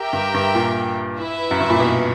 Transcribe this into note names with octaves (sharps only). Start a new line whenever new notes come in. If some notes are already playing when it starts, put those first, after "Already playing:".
Already playing: G4 A#4 E5 G5
G2
G2
A#2
E4 B4 E5
F#2
G2
A#2
B2